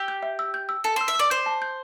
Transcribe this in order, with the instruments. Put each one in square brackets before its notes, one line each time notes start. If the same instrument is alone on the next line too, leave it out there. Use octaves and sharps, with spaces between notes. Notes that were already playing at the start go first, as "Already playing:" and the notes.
Already playing: [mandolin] G4 [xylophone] E6
[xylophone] G6
E5
E6
G6
E6
[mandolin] A4 [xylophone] A5
[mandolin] C5 [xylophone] E6
[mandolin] E5
[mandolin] D5 [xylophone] E6
[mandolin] C5 [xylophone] G6
[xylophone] A5
G6